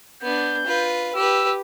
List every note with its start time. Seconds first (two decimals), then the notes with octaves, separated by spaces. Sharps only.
0.22 B3 D4 G6
0.66 F4 B4
1.15 G4 B4 E6